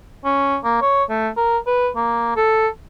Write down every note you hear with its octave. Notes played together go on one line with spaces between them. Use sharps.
C#4
A#3
C#5
A3
A#4
B4
A#3
A4